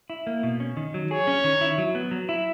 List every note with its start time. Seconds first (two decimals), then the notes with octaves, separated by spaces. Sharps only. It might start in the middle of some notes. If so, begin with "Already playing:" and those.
0.10 E4
0.27 A#3
0.43 B2
0.60 C#4
0.77 D#3
0.94 F#3
1.11 G#4 C#5
1.27 C#4
1.44 D#3
1.61 E4
1.78 F#3
1.95 B3
2.11 F#3
2.29 E4